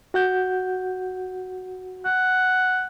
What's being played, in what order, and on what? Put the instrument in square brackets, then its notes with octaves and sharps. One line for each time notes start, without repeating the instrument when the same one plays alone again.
[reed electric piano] F#4 F#5 G6
[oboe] F#5